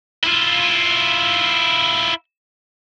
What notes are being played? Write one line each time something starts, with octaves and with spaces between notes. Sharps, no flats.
E4 F4